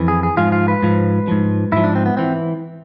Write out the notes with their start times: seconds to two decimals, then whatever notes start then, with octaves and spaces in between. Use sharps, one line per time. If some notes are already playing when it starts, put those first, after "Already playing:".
Already playing: F2 E3
0.08 G#4
0.23 G#4
0.37 G#2 F3 F4
0.52 F4
0.68 B4
0.82 G#2 F3
1.28 G#2 F3
1.72 G#2 F3 E4
1.84 D4
1.95 C4
2.06 B3
2.17 E3 C4